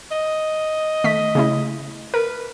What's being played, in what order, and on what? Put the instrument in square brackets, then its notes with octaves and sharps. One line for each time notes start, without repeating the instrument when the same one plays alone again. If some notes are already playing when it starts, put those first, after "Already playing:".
[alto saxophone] D#5
[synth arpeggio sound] D#3 A3 B6
C#3 A3 E4
[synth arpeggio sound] A#4 [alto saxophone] B4